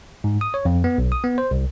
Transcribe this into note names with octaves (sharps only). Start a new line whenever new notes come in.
G#2
D#6
C#5
F2
B3
B1
D#6
B3
C5
C2